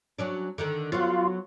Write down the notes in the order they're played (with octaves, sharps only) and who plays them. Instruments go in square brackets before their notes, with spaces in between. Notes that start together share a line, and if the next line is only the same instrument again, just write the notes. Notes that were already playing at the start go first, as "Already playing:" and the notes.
[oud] F#3 C#4 D4
D3 D#3 A4
[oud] F#3 B3 [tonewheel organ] F4